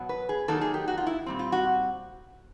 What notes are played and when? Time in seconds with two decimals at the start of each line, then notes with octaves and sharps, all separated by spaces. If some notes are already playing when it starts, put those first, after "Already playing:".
Already playing: B2 F#3 B3
0.09 B4
0.29 G#4
0.48 D#3 F#3 A#3 D#4 A4
0.61 G#4
0.74 G4
0.88 F#4
0.98 F4
1.07 E4
1.26 A#2 G3 C4
1.39 F4
1.52 F#4